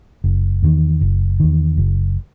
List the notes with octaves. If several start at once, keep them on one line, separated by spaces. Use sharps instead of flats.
F#1
E2 D#3
F#1
E2 D#3
F#1